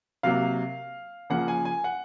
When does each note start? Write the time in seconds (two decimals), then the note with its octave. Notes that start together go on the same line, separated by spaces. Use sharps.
0.23 C3 F#3 A#3 F5
1.30 C#3 F3 A#3 F#5
1.48 G#5
1.65 G#5
1.84 F#5